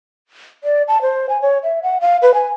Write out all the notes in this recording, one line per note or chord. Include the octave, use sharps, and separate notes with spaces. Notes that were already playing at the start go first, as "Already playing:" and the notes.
D5
A5
C5
G#5
C#5
E5
F#5
F5
B4
G#5